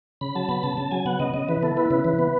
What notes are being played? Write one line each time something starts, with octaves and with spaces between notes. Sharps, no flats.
C#3 B5
F#3 A5
B3 B5
C#3 A5
C#3 A5
F#3 G#5
B3 F#5
C#3 D#5
C#3 D#5
E3 B4
B3 A4
E4 B4
C#3 B4
E3
B3